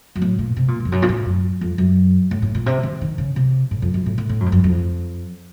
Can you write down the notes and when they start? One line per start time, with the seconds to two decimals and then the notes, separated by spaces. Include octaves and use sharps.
0.15 F#2
0.22 A2
0.39 A#2
0.56 C3
0.68 A#2
0.80 F#2
0.85 F2
0.92 F#2
1.02 A#2
1.09 A2
1.26 F#2
1.61 F2
1.78 F#2
2.31 A2
2.42 A2
2.55 A#2
2.66 C3
2.83 D#3
3.01 D#3
3.18 C#3
3.36 C3
3.71 A2
3.82 F2
3.94 F#2
4.06 A2
4.18 A2
4.29 A2
4.40 F#2
4.46 F2
4.52 F#2
4.64 F2